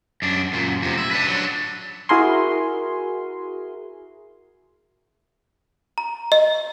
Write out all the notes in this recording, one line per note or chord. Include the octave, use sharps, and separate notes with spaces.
F#2 D4
F#2 A#2
F2 C3
E4
D4 B4
F#3 D4
E4 F#4 G#4 A#4 G#5 C6
A#5
D#5